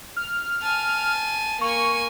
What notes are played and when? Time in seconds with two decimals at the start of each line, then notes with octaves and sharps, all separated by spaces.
0.16 F6
0.62 G#5 A5
1.61 A#3 G#5 C#6